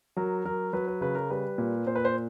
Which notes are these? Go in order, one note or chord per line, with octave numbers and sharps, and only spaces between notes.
F#3 A#4
F#3 A#4
F#3 B4
B4
C#3 B4
A#4
G3 B4
A#2
A#2 C5
B4
C5